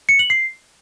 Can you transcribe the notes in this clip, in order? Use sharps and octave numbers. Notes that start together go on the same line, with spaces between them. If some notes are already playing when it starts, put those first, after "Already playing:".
C#7
F#7
C7